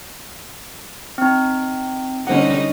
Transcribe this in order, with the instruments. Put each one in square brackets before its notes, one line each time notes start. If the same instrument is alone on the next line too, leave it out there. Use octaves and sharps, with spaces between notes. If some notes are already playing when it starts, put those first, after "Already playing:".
[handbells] C4 D#4
[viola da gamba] D3 G3 D#4 [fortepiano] C#4 C5 F#5